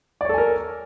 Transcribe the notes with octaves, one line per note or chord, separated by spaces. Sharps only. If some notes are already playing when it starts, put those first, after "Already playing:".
A4 A#4 C#5 D5 G#5